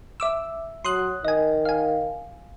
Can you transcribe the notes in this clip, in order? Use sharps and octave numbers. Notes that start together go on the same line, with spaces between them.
E5 D6 E6
F#3 C6 D#6 F#6
D#3 D#5 G#5
F5 G#5